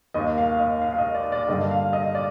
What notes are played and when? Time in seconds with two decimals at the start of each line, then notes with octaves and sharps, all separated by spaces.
0.14 D#2 D#3 A#3 D#5
0.38 F5
0.54 F5
0.59 D#5
0.81 F5
0.93 F5
0.98 D#5
1.14 D5
1.32 D5
1.48 G2 D3 G3 A#3 D#5
1.71 F5
1.93 D#5
2.15 D5